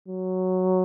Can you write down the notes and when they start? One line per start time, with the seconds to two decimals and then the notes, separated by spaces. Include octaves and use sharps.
0.08 F#3